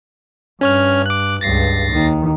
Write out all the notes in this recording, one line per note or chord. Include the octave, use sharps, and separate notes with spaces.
G2 C#4 C#5 F6
D6 F#6
C#2 G2 A6 A#6 C7
D#2 D#3